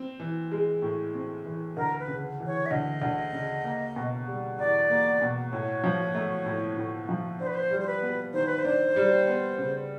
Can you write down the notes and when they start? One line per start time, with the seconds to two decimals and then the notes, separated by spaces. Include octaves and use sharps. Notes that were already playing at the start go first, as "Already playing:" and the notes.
Already playing: C4
0.20 E3
0.51 G#3
0.82 A2
1.15 C4
1.45 E3
1.77 D2 A#4
2.00 B4
2.07 C#3
2.40 E3
2.47 C#5
2.66 E5
2.71 D2 D#5
3.02 D2
3.32 C#3
3.64 A#3
3.96 B2
4.27 G3
4.58 E2 D5
4.89 A#3
5.21 B2
5.52 A2 C#5
5.84 F3
6.15 A3
6.46 A2
6.77 A2
7.09 F3
7.39 D4 C5
7.47 B4
7.54 C5
7.71 G3
7.80 C5
7.87 B4
8.02 B3
8.33 D#3 C5
8.46 B4
8.59 C5
8.65 D4
8.96 G3
9.28 B3
9.58 C#3